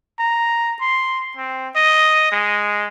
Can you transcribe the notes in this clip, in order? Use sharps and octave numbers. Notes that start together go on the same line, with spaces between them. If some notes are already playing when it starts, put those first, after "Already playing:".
A#5
C6
C4
D#5
G#3